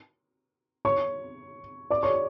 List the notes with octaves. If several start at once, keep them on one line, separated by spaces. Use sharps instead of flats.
C#5 C#6
D5 D6
C#5 C#6